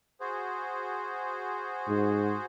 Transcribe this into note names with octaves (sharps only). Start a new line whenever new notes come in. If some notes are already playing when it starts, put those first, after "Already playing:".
F#4 G#4 C5
G#2